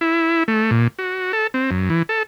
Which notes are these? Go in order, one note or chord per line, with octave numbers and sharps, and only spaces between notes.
E4
A3
A#2
F#4
A4
C4
F#2
E3
A4